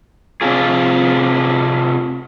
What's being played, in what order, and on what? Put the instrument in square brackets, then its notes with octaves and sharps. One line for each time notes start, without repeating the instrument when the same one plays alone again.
[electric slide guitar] C3 C4 D4 F4 G#4